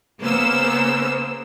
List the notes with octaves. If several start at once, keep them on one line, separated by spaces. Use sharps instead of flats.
C#3 A#3 B3 C5 E6